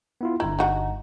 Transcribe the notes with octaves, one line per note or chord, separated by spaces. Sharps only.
B3 E4 F4
G1 G2 E4 A#5
D#4 F#4